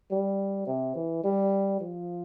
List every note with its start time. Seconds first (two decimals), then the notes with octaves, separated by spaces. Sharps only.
0.11 G3
0.67 C3
0.96 E3
1.24 G3
1.81 F3